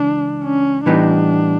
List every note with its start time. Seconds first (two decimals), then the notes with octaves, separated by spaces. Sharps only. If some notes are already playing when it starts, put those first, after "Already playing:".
Already playing: C#2 E3 D4
0.44 C#4
0.85 A2 E3 G3 B3 D4 D#4